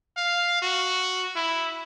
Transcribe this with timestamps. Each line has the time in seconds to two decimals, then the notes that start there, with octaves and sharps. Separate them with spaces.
0.17 F5
0.62 F#4
1.35 E4